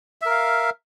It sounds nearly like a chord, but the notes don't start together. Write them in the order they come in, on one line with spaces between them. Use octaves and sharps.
E5 A#4 F5